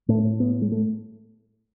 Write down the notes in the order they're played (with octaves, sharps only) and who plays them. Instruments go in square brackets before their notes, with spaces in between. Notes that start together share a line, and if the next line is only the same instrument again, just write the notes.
[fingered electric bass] A2 A3
B3
G#3
A3